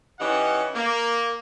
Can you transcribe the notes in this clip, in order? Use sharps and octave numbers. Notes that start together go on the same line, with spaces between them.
E3 C#4 D#4 G4 F#5
A#3